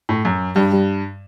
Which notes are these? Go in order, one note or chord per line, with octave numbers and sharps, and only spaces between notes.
A2
F#2
G2 G3